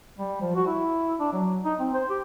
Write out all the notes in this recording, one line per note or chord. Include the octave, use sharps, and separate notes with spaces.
G3
F3
F#4
E4
D4
F#3
D#4
C4
C5
G4